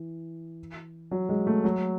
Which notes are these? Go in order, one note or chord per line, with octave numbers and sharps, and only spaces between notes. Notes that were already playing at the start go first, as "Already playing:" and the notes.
Already playing: E3
F#3
G#3
A3
F#3